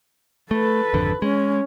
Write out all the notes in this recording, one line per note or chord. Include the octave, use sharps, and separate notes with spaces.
A3 A4 B4
G#1 F2 D3
G#3 C#4